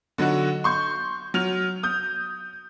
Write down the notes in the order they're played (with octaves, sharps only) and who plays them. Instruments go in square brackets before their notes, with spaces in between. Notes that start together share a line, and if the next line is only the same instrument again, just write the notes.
[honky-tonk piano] D3 F#3 D#4 F#4
C6 C#6 G6
F#3 F6 F7
D#6 G6